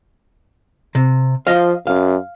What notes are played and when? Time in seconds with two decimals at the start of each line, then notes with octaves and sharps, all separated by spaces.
0.95 C3
1.47 F3 D#5 F5
1.87 F#2 F5